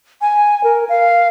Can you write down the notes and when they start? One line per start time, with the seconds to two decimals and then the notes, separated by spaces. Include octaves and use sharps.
0.21 G#5
0.64 A#4
0.89 F5